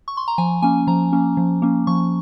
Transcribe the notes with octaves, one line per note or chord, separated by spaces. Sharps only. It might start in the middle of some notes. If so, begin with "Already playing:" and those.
C#6
C6
A#5
F3 G#5
A#3 C#4 G#5
F3 A#5
A#3 C#4
F3
A#3 C#4
F3 C#6